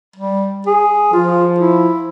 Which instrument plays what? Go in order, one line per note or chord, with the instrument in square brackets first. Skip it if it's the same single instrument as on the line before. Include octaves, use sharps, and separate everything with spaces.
[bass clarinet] G3
G#4
[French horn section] F3 [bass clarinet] F4
[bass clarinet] E4